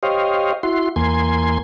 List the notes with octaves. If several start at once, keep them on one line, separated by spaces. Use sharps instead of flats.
G4 C5 C#5 D#5 F5
E4 F#4 C6
E2 A#3 G#5 C6